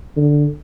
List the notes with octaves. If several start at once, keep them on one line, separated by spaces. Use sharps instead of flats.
D3